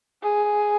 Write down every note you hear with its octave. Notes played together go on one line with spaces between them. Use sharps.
G#4